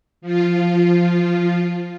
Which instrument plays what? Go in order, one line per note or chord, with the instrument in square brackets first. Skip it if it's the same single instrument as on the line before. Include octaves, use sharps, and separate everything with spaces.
[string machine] F3 F4